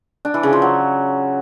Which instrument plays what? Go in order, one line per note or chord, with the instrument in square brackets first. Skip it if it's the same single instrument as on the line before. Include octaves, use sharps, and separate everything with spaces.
[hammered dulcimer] D4
E3
C#3
F3
F#3